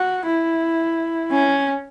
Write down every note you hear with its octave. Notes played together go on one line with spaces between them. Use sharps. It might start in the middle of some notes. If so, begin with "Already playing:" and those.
Already playing: F#4
E4
C#4